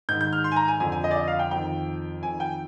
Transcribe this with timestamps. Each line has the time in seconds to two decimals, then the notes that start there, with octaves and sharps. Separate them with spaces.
0.09 G#2 D#3 G6
0.21 G6
0.33 F6
0.44 C6
0.52 G#5
0.56 A#5
0.68 G#5
0.80 F2 D3 G#5
0.92 G#5
1.04 D#5
1.11 D5
1.16 D#5
1.28 F5
1.39 G5
1.51 F2 D#3 G5
2.23 F2 D#3 G#5
2.40 G5